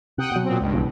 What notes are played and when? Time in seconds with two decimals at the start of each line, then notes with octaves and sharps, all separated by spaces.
0.18 C3 F#5 G5 D#6
0.32 B2 F#3
0.45 A#2 C4
0.60 C#2 G2
0.73 B1 B2 E3